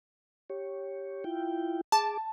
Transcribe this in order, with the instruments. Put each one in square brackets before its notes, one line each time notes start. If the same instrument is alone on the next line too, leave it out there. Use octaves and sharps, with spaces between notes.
[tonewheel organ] G4 C#5
E4 F4 G5
[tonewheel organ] G#4 D6 [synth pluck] A5